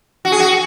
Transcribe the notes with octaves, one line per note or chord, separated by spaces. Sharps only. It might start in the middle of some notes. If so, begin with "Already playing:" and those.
F#4
G#4
F#4